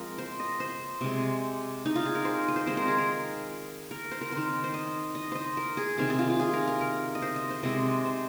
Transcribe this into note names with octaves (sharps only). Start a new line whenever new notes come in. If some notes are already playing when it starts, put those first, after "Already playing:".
Already playing: F3 G#3 C4 A#4 D#5
C5
D#5
C5
C3 G#3 C4
D#4
F4
G#4
A#4
C5
D#5
C5
D#3 G#3 C4 C5
A#4
G#4
A#4
A#4
C5
A#4
D#3 C4 C5
C5
D#5
D#5
C5 D#5
A#4
G#4
C3 D#3 C4 G#4
G#4
F4
F4
G#4
A#4
A#4
A#4
D#5
C5
D#5
C5
C3 G#3 C4 D#5
C5